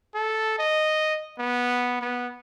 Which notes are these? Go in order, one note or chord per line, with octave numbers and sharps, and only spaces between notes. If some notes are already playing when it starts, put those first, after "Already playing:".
A4
D#5
B3
B3